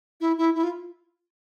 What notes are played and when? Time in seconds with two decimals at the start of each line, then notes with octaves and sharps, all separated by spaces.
0.21 E4
0.38 E4
0.55 E4
0.63 F4